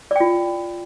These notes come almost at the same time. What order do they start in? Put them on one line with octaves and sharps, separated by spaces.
D5 G5 F4